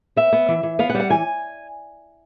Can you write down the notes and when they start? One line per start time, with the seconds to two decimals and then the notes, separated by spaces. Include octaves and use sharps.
0.16 B3 E5
0.33 B3
0.48 E3
0.63 E3
0.79 B3 F5
0.90 F#5
0.95 G3
1.00 F#5
1.10 E3 G#5